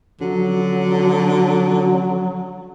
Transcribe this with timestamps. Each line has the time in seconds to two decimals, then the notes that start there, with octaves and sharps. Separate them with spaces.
0.21 D3 F3 F#3 C#4 F#4